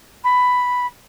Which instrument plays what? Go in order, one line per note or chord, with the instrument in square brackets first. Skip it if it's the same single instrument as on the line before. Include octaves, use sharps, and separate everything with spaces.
[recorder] B5